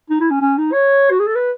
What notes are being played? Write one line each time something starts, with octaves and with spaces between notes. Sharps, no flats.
D#4
E4
C#4
C#4
D#4
C#5
F#4
G#4
A4
B4